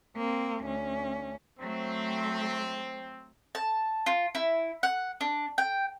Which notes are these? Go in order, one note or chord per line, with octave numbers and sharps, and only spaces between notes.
A#3 C4
D2 C#4
F#3 A3 C4
A5
F4
E4
F#5
D4
G5